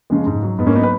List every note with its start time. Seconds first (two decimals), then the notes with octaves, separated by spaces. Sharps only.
0.10 C#3 F3 G#3
0.26 G#2
0.43 F#3
0.59 G#2 B3
0.67 A#3 C#4
0.75 F#3 B3 D#4
0.83 B4